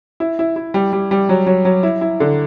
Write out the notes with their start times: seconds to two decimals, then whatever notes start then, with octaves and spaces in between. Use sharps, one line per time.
0.20 E4
0.39 E4
0.56 E4
0.74 G3
0.93 G3
1.11 G3
1.29 F#3
1.47 F#3
1.65 F#3
1.83 E4
2.01 E4
2.20 D3